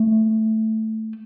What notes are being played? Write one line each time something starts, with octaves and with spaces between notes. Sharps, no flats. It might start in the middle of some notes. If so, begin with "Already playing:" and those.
Already playing: A3